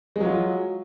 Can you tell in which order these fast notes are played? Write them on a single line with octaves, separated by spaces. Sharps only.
G#3 F#3 F4